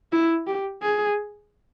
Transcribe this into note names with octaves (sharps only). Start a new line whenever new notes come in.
E4
G4
G#4